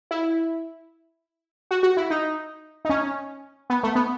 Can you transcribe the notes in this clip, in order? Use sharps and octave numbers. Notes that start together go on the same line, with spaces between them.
E4
F#4
F#4
E4
D#4
D#4
C#4
B3
A3
B3